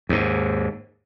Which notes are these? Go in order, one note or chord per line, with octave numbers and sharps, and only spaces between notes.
D#2 G#2